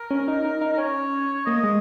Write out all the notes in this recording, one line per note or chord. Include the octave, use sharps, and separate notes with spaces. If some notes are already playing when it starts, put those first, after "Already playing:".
Already playing: A#4
C#4
D#4
D#4
D#4
A#4
C#4 C#5
A#3 D#5
G#3